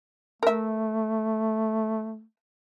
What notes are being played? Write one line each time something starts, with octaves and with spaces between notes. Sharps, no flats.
A3 A#4 E5